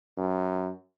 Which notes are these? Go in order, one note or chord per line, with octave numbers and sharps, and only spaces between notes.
F#2